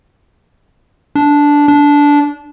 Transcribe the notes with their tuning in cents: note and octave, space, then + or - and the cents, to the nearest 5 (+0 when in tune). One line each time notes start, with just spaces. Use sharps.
D4 -10
D4 -15